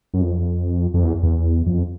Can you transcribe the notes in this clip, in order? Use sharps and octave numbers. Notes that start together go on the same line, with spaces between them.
F#2
F2
F2
E2
E2
F2